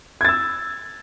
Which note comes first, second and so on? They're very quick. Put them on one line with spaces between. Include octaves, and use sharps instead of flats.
G#6 A6 E6